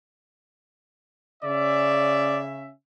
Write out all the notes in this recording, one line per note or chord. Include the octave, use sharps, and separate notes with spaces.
C#3 C#4 D5 E5